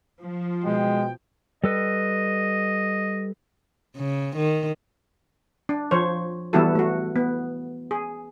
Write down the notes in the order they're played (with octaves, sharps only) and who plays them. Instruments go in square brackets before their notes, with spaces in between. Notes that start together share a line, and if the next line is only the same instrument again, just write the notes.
[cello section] F3
[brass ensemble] B2 F#4 G5 [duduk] G#3
[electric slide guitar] G3 A4 B4 [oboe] D#5
[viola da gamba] C#3
D#3
[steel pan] D4
F3 C5 C#5
E3 G3 B3 E4 F#4 A4
A3 F#4
B3
G#4